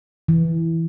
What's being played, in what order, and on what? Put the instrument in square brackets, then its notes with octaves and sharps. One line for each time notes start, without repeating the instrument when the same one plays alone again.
[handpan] E3